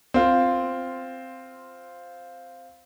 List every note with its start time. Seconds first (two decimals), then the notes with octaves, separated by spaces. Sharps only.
0.14 C4 F4